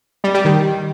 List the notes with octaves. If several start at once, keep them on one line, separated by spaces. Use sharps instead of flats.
G3
G3
D#3